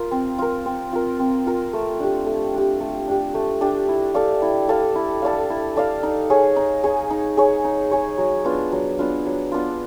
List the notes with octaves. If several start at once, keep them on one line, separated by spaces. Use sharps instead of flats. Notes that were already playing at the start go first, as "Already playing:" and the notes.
Already playing: F4 A#4
C4
F4 A#4
C4
F4 A#4
C4
F4 A#4
A3
D4 G4
A3
D4 G4
A3
D4 G4
A3
D4 G4
E4
A4 D5 F5
E4
A4 D5 F5
E4
A4 D5 F5
E4
A4 D5 F5
D#4
G#4 C#5
D#4
G#4 C#5
D#4
G#4 C#5
D#4
G#4 C#5
F#3
B3 D4 F4
F#3
B3 D4 F4
F#3
B3 D4 F4